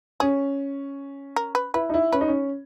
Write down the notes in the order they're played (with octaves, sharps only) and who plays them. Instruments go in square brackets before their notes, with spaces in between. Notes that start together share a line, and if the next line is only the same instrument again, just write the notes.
[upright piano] C#4 [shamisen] G#4
[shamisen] A#4
B4
[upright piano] E4 [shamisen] B4
[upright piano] D#4
E4
[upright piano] C#4 [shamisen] B4
[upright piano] D#4
C#4